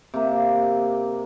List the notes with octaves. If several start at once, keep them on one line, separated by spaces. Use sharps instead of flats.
C3 A#3